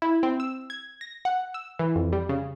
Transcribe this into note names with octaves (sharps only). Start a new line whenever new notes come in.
E4
C4
E6
G#6
A#6
F#5
E6
E3
F2
G3
C#3